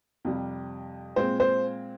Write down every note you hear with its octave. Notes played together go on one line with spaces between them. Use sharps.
F2 C3 G3
A#2 G#3 C4 C5
C5